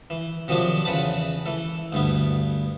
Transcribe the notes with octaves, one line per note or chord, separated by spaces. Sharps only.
E3
C3 D#3 F3 F#3 D4
E2 C#3 B4 F#5 A5
E3 A4
D2 G2 B3